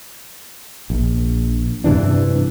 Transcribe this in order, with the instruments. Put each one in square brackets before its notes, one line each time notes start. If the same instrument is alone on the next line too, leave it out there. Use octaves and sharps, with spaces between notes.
[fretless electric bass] A#1
G2 C3 E3 D4